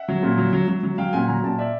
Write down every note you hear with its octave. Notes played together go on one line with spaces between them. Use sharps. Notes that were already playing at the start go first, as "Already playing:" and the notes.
Already playing: E5 F#5
F#3
A#2
F#3
F#3
F#3
F#3
F#3 F5 G5
A#2 F#5 G#5
F#3 G#5 A#5
A#2 G5 A5
D5 E5